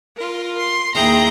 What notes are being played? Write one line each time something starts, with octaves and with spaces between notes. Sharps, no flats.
F4 A#4
C6
D#2 E4 G#4 G5 A#5 G6